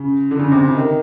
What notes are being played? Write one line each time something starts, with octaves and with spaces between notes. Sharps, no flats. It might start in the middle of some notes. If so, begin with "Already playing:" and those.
Already playing: C#3
D3
C#3
C3
C#3
D#3